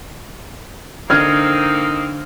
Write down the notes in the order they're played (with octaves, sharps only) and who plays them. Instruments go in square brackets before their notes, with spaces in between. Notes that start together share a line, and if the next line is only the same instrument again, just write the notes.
[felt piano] D3 F6 G#6 [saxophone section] A#3 C4 D#4